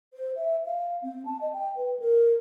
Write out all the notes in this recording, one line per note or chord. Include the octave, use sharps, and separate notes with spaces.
C5
E5
F5
C4
A5
D#5
G5
B4
A#4